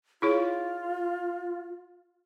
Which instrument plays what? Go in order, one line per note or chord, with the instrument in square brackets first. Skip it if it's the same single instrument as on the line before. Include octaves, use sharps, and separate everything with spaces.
[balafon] E4 G#4 C#5 [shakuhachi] F4